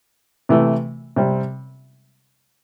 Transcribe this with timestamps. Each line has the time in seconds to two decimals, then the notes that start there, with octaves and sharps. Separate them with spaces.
0.49 C3 E3 A3
1.16 C3 G3 C4